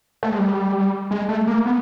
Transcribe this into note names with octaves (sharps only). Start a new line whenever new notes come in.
A3
G#3
G3
G#3
A3
A#3
B3